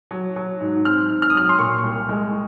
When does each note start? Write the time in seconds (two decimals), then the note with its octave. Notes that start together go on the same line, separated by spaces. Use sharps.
0.11 F#3
0.36 F#3
0.60 G#2
0.85 C4 F6
1.10 G#2
1.22 F6
1.30 D#6
1.34 F#3 F6
1.49 C6
1.59 A#2 C#6
1.84 C2
2.09 G#3